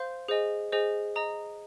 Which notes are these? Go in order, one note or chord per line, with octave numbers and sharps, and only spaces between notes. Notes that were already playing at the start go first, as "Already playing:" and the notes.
Already playing: C5 F5 C6 G6
G#4 C5 D#5 G#5
G#4 C5 D#5 G#5
D#5 A#5 D#6